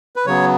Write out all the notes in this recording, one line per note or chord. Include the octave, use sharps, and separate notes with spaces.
B4
C#3 F#3 B3 C#5